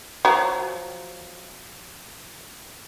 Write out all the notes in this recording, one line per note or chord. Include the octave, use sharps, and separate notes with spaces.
F3 F#3